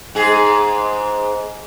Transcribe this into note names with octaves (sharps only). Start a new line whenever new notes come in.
G#2 G#4